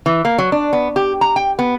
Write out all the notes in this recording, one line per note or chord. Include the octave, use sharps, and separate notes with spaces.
E3
A#3
F#3
D4
B3
G4
A#5
G5
B3